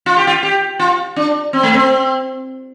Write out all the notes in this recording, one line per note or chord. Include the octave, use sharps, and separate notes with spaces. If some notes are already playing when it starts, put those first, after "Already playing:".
F4
G4
F4
G4
F4
D4
C4
A3
C4